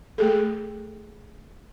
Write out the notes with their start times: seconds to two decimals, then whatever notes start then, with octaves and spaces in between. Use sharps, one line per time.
0.18 A3 G#4 A4